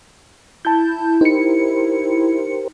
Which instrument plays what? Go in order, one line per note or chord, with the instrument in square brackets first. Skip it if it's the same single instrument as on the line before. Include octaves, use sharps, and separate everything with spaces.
[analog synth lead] E4 [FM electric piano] A5 G6
[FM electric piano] D#4 C#7 [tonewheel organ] G4 A#4 C5